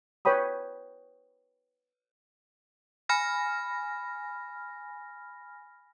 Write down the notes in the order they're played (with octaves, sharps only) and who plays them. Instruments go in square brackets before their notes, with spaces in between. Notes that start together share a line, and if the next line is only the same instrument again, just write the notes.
[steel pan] B4 C#5 G5 B5 D#6
[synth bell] G#5 B5 F6 A#6